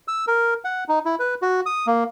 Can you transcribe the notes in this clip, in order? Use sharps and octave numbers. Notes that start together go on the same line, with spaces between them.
E6
A#4
F#5
D#4
E4
B4
F#4
D#6
A#3